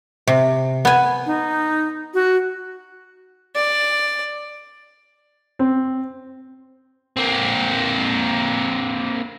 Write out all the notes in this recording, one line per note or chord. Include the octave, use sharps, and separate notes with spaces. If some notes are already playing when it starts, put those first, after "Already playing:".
C3
B3 G#5
D#4
F#4
D5
C4
A#3 C4